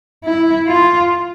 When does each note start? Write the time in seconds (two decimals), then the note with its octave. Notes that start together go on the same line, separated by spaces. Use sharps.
0.24 E4
0.68 F4